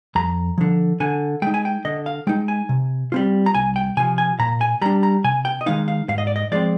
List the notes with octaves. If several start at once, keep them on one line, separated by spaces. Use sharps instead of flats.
F2 A#5
D3 F3
D3 G#5
G#3 D#4 G5
G#5
G5
D3 D#5
F5
G#3 D#4 G5
G#5
C3
G3 C4 F4
A#5
C2 G#5
G5
C3 F3 G#5
G#5
A#2 A#5
G#5
G3 D4 A#5
A#5
C3 G#5
G5
D#5
D#3 G#3 D#4 F5
F5
G#2 F5
D#5
D5
D#5
F3 G#3 C4 D5